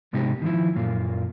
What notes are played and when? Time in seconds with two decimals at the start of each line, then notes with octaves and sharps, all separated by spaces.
0.13 G#2 C3 G#3 B3 D#4 G4
0.42 D#3 F3 E4
0.75 F#2 A#2 A#3 F4